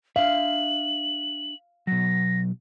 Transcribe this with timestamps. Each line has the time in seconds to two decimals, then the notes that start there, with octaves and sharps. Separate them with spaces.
0.16 D4 E5 F5 F#7
1.87 B2 F#3 A#6